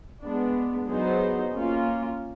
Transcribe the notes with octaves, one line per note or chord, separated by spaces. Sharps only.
G#3 B3 D4
F#3 B3 D#4 G#4 C5
A#3 C#4 F4